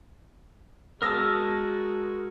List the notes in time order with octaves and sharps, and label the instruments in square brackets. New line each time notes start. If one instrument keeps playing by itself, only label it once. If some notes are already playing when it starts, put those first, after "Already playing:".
[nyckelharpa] G#3 F#4 [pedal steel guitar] A#4 A5 [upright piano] D#6 E6 A#6